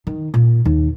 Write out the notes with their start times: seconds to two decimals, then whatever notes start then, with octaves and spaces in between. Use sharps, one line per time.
0.07 D#3
0.34 A#2
0.65 D#2